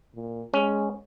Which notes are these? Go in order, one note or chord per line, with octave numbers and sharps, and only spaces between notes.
A#2
G#3 C#4